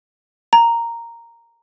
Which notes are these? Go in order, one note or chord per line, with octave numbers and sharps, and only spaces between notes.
A#5